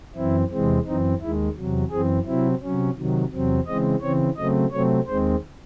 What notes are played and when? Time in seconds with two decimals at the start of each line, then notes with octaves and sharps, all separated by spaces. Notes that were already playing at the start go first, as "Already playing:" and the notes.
0.15 F#2 E3 C4 E4
0.50 E2 C3 E3 G#3 C4
0.86 F#2 E3 C4 D#4
1.20 D#2 D#3 G#3 E4
1.56 E2 C3 F#3
1.90 F#2 E3 C4 G#4
2.26 C3 F#3 C4 E4
2.62 C3 F#3 C#4
2.97 C3 D#3 F#3
3.32 E2 C3 F#3 C4
3.67 C#3 E3 G#3 C4 D#5
4.01 C#3 E3 C4 C#5
4.37 C#3 F#3 A3 C4 D#5
4.72 C3 F#3 A3 C4 C#5
5.07 D#2 D#3 G#3 C4 C5